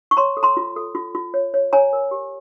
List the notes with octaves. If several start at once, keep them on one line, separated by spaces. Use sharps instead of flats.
C#6
C#5 A#5 C6
A4
A#5 C6
F4
A4
F4
F4
C#5
C#5
C#5 G#5 A#5
A#4
G4